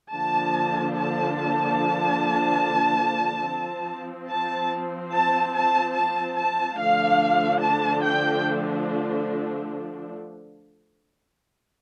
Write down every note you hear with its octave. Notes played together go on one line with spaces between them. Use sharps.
D3 F3 A#3 D4 A5
A5
F3 C4
A5
A5
A5
A5
A5
D3 F3 A3 D4 F5
A5
G5